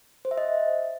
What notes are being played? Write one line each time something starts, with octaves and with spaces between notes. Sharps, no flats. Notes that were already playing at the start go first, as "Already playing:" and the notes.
C5
E5
D#5